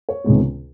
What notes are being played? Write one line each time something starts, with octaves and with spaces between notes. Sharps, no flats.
C#5
C#2 C3 D#3 G#3 B3